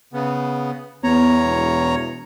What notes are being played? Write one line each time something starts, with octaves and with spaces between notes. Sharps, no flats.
C#3 B3
E2 B3 C#5 A#5
E1